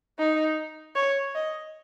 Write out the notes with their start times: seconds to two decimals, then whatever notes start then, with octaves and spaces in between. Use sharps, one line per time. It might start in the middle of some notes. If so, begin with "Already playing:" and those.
0.18 D#4
0.96 C#5
1.35 D#5